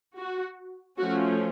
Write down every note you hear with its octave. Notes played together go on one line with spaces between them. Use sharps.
F#4
F3 A3 C#4 F#4